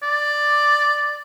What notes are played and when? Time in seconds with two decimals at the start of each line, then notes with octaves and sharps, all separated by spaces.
0.03 D5